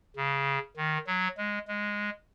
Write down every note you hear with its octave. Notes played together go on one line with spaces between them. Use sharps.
C#3
D#3
F#3
G#3
G#3